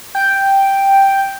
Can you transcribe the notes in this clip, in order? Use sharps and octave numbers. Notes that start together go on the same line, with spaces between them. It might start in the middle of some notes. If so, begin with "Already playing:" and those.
G5